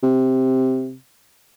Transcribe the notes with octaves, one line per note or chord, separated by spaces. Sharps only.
C3